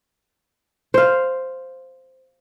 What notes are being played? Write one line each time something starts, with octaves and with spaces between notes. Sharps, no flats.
C5 F5